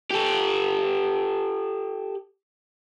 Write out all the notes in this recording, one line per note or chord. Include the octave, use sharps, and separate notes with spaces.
G4 A4